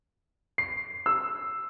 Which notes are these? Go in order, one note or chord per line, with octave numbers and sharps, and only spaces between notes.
C7
E6